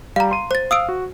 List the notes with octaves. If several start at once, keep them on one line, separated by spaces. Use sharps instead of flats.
G3 F5 A#5
C6 D#7
C5 A6
F5 D#6 E6 D7
F#4